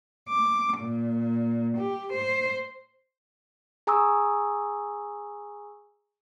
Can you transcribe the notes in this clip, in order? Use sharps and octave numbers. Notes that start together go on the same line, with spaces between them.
D6
A#2
G4
C5
G#4 G#5 A#5 C#6 D#6 E6